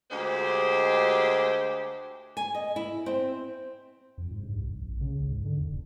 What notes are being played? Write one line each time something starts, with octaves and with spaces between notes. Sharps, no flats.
D2 G#3 G4 C5
G#5
D#5
E4
C4
F2
G#2
G2
C2
A#1
C#3
C#2
G#2
D3
E2
D1